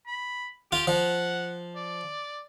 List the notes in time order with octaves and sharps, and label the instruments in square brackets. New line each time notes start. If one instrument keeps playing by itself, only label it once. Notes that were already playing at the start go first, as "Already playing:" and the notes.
[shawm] B5
[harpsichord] F4 [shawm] G4
[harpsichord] F3 [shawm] F#5
[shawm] D5